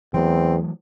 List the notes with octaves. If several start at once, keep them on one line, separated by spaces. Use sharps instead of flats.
E2 E3 F#3 A3 C4